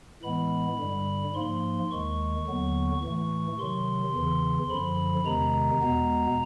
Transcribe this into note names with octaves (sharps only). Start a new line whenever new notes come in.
A2 E3 G#3 B3 B5
G2 D3 G3
G#2 F3 A#3 C6
D#2 D#3 G#3 C#6
D#2 D3 F#3 B3
A2 E3 A3 C#6
C3 D#3 F#3 C6
E2 C#3 E3
F#2 D3 F3 B5
E2 C3 D#3 G#3 A#5
E2 B2 G#3 B3